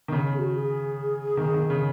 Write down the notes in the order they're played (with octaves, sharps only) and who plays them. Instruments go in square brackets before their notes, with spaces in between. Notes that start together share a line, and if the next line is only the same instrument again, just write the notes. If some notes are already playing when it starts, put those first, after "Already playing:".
[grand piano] D#3
C#3
[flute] G#4
F#4
G#4
[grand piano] D#3
D#3
C#3